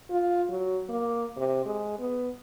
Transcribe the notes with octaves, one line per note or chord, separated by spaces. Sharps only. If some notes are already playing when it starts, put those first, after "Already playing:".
F4
F#3
A#3
C3
G#3
B3